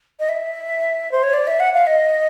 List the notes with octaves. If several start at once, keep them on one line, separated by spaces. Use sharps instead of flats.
D#5
E5
C5
C#5
D5
E5
F#5
F5
D#5